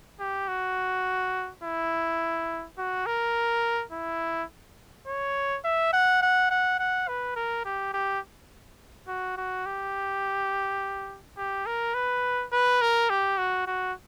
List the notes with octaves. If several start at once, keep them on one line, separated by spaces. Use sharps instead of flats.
G4
F#4
E4
F#4
A#4
E4
C#5
E5
F#5
F#5
F#5
F#5
B4
A#4
G4
G4
F#4
F#4
G4
G4
A#4
B4
B4
A#4
G4
F#4
F#4